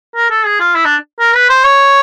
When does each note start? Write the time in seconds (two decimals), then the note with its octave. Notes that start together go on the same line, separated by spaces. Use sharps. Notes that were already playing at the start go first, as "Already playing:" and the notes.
0.16 A#4
0.30 A4
0.45 G#4
0.60 F4
0.75 E4
0.85 D4
1.19 A#4
1.34 B4
1.49 C5
1.64 C#5